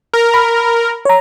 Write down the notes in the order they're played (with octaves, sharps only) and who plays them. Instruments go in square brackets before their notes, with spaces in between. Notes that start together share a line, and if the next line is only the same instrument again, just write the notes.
[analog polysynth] A#4
[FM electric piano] B5
C#5 A#5